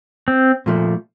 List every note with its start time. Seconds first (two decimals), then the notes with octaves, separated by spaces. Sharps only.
0.28 C4
0.66 A#2 F3 A3